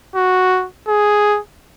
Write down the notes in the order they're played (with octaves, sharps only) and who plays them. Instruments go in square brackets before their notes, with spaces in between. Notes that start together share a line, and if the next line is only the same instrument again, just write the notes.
[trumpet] F#4
G#4